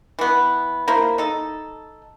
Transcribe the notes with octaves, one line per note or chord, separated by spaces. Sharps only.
E3 B3
A#3 E4 C5
D#4 A4